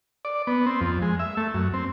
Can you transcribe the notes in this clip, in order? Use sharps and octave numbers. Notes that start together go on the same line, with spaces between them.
D5
B3
C4
F2
G#3
E5
A3
F#2
C4